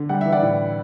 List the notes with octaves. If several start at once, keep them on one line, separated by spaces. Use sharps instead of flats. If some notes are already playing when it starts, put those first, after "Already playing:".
Already playing: D3
G3 F#5
E3 E5
D5 F#5
A2